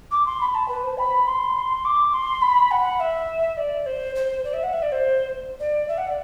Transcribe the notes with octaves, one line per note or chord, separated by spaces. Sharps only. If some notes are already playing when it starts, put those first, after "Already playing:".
D6
C6
B5
A5
B4
C5
B5
C6
D6
C6
B5
F#5
E5
D5
C5
C5
D5
E5
F#5
E5
D5
C5
D5
E5
F#5
D5